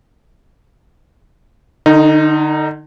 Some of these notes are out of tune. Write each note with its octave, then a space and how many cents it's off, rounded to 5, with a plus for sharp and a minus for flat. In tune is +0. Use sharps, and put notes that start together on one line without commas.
D3 +35 D#4 +0